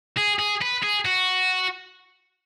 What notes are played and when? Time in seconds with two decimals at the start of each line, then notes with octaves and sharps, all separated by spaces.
0.17 G#4
0.39 G#4
0.61 B4
0.83 G#4
1.05 F#4